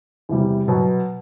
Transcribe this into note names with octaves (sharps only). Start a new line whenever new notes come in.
E2 C3 G3
B2 F#3 B3